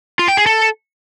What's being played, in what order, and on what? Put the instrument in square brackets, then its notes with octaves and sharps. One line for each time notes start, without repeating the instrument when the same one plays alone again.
[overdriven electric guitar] F4
G5
G#4
A4